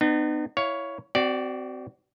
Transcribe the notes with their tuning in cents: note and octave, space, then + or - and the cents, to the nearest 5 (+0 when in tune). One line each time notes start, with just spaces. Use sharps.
B3 +30 D#4 -40
E4 +0 C#5 +10 F5 +15
C4 -20 F#4 +25 D5 +0